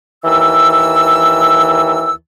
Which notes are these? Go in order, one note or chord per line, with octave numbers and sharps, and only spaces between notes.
D#2 E3 E6